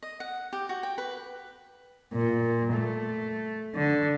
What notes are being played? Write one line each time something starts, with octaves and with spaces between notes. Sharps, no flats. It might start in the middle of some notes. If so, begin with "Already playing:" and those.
D#5
F#5
G4
F#4
G5
B4
A#2
A3
D3